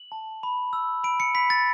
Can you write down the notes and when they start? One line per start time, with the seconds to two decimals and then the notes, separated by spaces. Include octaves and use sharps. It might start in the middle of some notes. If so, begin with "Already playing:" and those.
Already playing: F#7
0.12 A5
0.43 B5
0.73 E6
1.04 B5 D7
1.20 C#7
1.34 B5 B6
1.50 A6